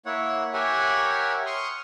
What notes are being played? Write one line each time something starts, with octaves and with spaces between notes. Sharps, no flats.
A#3 E4 C#5 F#5
G4 A#4 C#5 E5 F#5 G#5
C6 C#6 D#6 F6